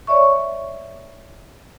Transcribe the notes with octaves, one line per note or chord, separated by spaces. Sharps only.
C#5 D5 E5 C#6